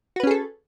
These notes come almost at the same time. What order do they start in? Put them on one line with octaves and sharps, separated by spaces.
F#4 B4 C#4 G#4 A4